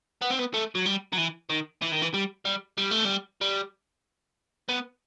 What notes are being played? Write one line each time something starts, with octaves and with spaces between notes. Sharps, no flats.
B3
C4
B3
A3
F#3
G3
F#3
E3
D#3
E3
D#3
E3
G3
G3
G3
A3
G3
G3
B3